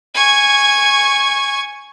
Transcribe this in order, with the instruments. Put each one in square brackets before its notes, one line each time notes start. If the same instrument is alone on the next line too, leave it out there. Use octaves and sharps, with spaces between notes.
[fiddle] G#5 C#6